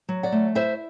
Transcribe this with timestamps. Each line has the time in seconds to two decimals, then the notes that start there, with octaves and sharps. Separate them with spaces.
0.09 F#3
0.23 D5 F#5
0.32 A3
0.55 E4 C5 E5